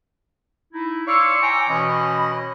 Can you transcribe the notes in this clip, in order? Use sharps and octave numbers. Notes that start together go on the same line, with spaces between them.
D#4 E4
C#5 D5 F5 C6 C#6 E6
G5 G#5 A#5 D6
B2 E3 C#4 D#5 B5